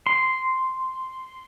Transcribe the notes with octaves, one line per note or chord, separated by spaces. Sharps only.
C6